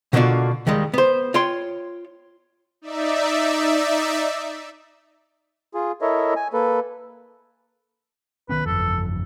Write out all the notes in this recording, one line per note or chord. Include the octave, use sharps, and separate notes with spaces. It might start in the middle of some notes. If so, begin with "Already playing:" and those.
B2 D3 A#3 D4 F4 F#4
D#2 D#3 G3 G#3
B3 C5
F4 C#5 G5 C6
D#4 D5 E5
F4 G#4
E4 A4 A#4 C#5 D#5 E5
G#5
A#3 A4 B4
D#3 B3 C#4 B4
G1 F2 A4